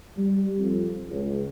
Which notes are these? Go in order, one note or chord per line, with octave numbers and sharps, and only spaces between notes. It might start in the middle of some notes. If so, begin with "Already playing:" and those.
G3
F2
C#2